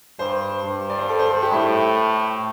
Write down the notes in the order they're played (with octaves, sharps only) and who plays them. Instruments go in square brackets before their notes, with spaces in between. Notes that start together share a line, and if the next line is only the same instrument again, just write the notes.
[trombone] G2 [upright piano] C5
[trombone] G2
[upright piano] D5
C5
A4
C5
A4
G4
[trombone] A2 [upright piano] E4